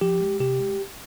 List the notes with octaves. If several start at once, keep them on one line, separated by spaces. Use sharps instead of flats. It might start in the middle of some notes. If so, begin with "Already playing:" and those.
F3 G4
G#3
C3 G4
G#3